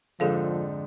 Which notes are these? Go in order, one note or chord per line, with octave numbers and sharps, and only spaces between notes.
F2 G#2 D3 F3 G#4 A4 F5